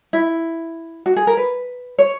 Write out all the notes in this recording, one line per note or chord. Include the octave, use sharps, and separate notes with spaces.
E4
F#4
G#4
A#4
B4
C#5